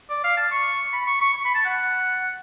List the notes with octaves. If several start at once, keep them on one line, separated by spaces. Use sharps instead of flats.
D5
F5
A5
C#6
B5
C#6
C#6
C#6
B5
A5
F#5